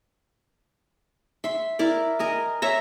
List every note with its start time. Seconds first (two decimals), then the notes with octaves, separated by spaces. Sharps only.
1.44 E5 C6
1.79 E4 A#4 D5
2.19 A#4 D#5 G#5
2.62 C#5 E5 A#5